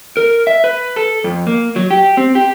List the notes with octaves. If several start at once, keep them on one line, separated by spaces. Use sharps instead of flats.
A#4
E5
B4
A4
F2
A#3
F#3
G4
C4
G4